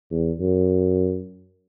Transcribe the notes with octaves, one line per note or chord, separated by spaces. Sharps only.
E2
F#2